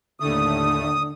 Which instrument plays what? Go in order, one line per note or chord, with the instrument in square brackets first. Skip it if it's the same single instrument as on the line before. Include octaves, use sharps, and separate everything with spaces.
[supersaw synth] D#2 A2 A3 [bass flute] D3 [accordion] D#6